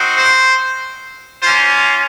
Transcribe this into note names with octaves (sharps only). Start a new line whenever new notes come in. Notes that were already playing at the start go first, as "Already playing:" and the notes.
Already playing: C4 D#4 F#4
C5
A#3 C#4 F4 C5